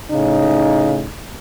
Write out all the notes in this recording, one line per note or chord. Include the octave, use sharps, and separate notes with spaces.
A2 C#3 D#4